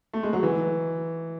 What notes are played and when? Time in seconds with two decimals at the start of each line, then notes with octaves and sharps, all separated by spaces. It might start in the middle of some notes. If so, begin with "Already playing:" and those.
0.13 A3
0.23 G#3
0.33 F#3
0.43 E3